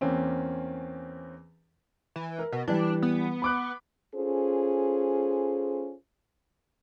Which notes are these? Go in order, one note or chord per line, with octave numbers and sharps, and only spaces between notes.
E2 A#3 C4 C#4
E3
A#4
B2
E3 G3 D4
B3
B5 D6 F#6
C#4 F4 G#4 A4 C5